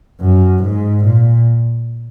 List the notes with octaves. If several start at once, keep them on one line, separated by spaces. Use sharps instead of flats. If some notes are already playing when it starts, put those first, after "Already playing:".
F#2
G#2
A#2